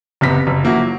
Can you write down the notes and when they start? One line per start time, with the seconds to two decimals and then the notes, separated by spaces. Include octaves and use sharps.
0.21 F#1 C3 B3 B6
0.47 F#1
0.64 F3 A#3 E4 F#4
0.78 F#3